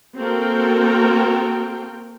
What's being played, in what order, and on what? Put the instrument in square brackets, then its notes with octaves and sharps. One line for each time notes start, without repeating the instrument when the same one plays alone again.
[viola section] A#3 C4 F#4 A4 A#4 G5